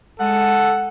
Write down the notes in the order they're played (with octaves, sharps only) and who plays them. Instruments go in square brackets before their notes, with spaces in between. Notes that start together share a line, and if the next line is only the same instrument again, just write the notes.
[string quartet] G#3 [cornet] A4 [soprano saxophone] F#5